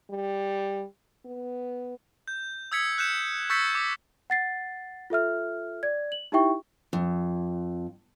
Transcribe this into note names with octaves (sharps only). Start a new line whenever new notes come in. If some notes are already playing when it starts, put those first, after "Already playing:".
G3
B3
G6
D#6 E6 G#6 B6 C#7
F#6 G6 C#7 E7
C#6 E6 G6 A6 B6 C#7
D6
F#5 A6 C7
F4 A4 E5 F6
D5 G#6
F#7
D#4 E4 G4 E5 G5 C#6
F2